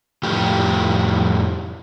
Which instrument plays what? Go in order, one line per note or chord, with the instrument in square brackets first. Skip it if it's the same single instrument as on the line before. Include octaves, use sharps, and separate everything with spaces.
[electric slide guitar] F2 A2 G4